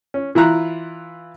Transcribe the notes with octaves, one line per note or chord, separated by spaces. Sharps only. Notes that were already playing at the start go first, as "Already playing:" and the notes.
C#4
E3 E4 F4 A#5 F#6